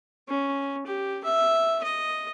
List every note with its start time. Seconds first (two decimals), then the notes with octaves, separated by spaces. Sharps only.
0.29 C#4
0.87 G4
1.24 E5
1.83 D#5